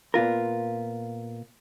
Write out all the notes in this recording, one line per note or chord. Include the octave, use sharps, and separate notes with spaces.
A#2 B3 F4 A#4